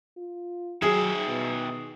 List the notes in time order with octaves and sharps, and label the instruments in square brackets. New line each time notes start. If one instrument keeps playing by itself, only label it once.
[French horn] F4
[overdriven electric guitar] D#3 E5 [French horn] F#3 [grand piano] G#4
[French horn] B2